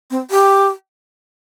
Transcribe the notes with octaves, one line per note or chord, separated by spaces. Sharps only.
C4
G4